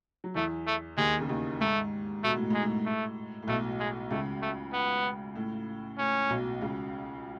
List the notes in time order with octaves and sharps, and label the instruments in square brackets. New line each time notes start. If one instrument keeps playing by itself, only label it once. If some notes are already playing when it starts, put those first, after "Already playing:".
[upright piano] F#3
[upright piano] E2 E3 [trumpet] A3
[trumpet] A3
[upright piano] D#2 D#3 [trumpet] G#3
[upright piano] C#3
D#2 D#3
[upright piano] G#2 [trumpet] A3
[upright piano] B2 [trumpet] A3
[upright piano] A2
[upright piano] G#2 [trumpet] G#3
[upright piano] A2
[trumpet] A3
[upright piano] A2
[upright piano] B1 B2 [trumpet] A3
[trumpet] G#3
[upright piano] C#2 C#3 [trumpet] A3
[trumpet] A3
B3
[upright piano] A2
[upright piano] A2 [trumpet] C#4
[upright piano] B1 B2
C#2 C#3